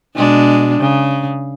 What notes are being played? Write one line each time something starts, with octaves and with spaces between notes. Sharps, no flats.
B2 G#3 D4
C#3